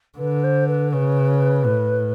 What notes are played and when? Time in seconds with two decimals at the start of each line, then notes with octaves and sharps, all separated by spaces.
0.18 D3 B4
0.43 C5
0.67 B4
0.92 C#3 B4
1.65 A2